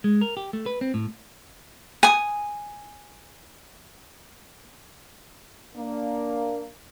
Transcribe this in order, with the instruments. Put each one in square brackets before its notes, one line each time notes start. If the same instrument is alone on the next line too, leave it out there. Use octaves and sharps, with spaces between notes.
[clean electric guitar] G#3
A#4
G4
A3
B4
C4
A2
[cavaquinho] G#5 D#6
[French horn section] A#3 D4